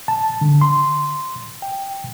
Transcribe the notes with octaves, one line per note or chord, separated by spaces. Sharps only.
A5
D3
C6
G5